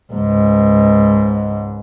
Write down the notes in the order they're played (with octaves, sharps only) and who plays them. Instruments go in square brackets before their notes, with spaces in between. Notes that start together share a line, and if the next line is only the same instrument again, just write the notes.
[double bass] C#2 G#2